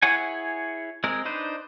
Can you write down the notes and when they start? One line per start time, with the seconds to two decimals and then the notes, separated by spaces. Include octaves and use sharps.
0.02 E4 G#4 C#5 F#5 G#5
1.04 G#3 C4 A#4
1.25 D4 D#4 B4 C5